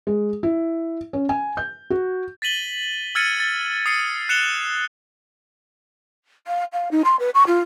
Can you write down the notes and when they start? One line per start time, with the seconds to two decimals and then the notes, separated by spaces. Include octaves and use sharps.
0.07 G#3
0.43 E4
1.13 C#4
1.29 G#5
1.57 G6
1.90 F#4
2.42 A6 B6 D#7 F#7 G7
3.15 E6 F6 G#6 A6 C#7 D#7
3.40 A6
3.86 D#6 C7 C#7 D#7
4.29 F#6 C#7 E7 F7 G7
6.47 F5
6.72 F5
6.91 D#4
7.04 C6
7.19 B4
7.34 C#6
7.46 F4